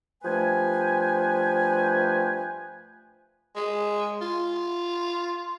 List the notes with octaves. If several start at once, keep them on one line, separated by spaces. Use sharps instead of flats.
G2 F3 A3 B4 G5 G#5
G#3
F4